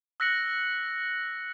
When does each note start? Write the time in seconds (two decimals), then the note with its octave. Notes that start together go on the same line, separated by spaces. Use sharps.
0.20 E6 F#6 A#6 B6 C#7 F#7